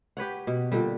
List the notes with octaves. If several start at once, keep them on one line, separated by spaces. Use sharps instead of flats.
G4 B4 C#5 F#5
B2
A#2 D3 G3